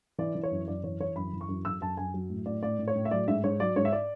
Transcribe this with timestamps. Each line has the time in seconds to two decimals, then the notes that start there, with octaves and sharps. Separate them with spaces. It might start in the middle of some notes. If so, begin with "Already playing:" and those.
0.18 E3 D5
0.35 E3
0.43 C#5
0.51 F#2
0.67 F#2 D5
0.84 E3 C#5
1.00 E3 C#5
1.16 F#2 B5
1.33 E3
1.41 C#6
1.49 F#2
1.65 F#2 E6
1.81 F#2 A5
1.97 F#2 G#5
2.14 F#3
2.30 A2
2.46 A2 D5
2.63 A2 D5
2.79 A2
2.88 C#5
2.95 A2
3.05 E5
3.11 F#3 D5
3.28 G#2 E5
3.43 G#2 C#5
3.60 F#3 D5
3.76 G#2 C#5
3.85 E5
3.92 D5